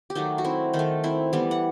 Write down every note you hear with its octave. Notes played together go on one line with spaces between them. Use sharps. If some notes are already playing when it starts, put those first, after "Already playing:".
G4
D#3 F#3 A3 D#4 F#4
F#4
C4 E4
D#3 D#4
A3
C4 E4
E3 G3 B3
F#5